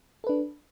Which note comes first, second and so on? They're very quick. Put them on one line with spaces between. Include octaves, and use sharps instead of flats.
A4 B4 D4